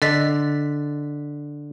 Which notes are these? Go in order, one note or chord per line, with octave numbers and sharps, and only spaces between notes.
D3 D#5 A6 B6